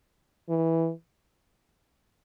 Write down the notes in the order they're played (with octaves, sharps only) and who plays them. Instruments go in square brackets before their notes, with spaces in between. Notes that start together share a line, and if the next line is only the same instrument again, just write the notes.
[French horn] E3